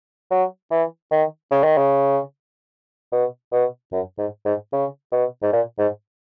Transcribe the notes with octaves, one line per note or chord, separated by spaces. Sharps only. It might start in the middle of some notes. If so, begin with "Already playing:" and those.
F#3
E3
D#3
C#3
D#3
C#3
B2
B2
F#2
G#2
G#2
C#3
B2
G#2
A#2
G#2